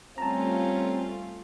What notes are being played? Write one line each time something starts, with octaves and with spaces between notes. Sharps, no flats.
G3 A3 C4 C#4 F4 A5 A#5